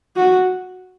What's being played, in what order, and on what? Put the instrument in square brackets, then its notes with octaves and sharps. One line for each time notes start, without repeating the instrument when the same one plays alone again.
[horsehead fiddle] F#4